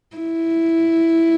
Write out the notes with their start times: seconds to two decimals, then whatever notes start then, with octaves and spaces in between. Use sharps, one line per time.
0.17 E4